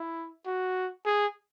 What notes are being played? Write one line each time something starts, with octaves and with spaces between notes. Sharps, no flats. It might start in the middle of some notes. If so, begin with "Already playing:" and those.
Already playing: E4
F#4
G#4